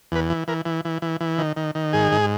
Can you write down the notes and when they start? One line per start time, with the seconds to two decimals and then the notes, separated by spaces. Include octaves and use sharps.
0.12 E2 B4
0.30 E3
0.48 E3 A#4
0.65 E3
0.85 E3
1.02 E3
1.21 E3
1.38 D#3
1.56 D#3
1.75 D#3
1.93 G#2 G#4
2.12 G#2